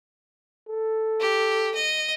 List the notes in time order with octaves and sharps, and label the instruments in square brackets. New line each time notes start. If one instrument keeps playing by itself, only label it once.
[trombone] A4
[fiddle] G4
D#5